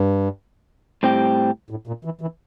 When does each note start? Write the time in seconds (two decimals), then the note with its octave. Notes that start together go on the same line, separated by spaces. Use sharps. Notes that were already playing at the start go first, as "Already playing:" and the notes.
Already playing: G2
1.03 A2 G3 C4 G4
1.70 A2
1.87 A#2
2.05 E3
2.21 E3